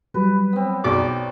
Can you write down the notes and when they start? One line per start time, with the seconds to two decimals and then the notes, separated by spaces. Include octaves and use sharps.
0.14 F#3 G3 B4
0.53 B3 C4
0.84 B1 G#4 D5 D6